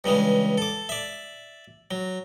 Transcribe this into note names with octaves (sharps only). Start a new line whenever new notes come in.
G2 C#3 E3 G#3
A4 D6
D5 E5
F#3